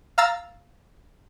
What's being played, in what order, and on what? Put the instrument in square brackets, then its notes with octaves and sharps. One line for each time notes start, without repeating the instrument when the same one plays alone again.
[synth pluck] F5 A#5 E6 A6